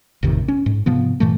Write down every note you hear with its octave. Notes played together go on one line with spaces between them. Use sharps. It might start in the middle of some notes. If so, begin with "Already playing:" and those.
A1 F2 C3 D#3
C#4
G#2
G#2 C3 F3 B3
G2 A#2 E3 A3